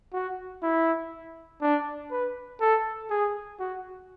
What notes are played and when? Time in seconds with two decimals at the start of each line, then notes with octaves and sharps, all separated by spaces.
0.13 F#4
0.63 E4
1.62 D4
2.11 B4
2.60 A4
3.10 G#4
3.59 F#4